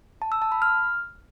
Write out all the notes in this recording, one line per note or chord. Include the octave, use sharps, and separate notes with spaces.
A5
E6
A5
B5
F6